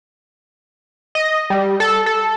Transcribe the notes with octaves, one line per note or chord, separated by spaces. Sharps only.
D#5
G3
A4
A4